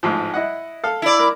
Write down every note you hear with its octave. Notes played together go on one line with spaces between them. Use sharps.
A1 G#2 F3
E4 D#5 F#5
A4 F5
E4 D5
A#4